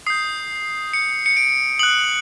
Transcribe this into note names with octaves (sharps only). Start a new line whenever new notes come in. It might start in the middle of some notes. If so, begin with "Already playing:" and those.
D#6 G6 C7
C#7
C#7
D7
D#6 F#6 F#7